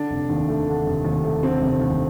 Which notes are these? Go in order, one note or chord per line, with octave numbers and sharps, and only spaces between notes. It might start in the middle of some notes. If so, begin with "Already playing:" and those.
Already playing: D3 D4
F1
D#2
A3
D3
F1
D#2
A3
D3 C4
F1
D#2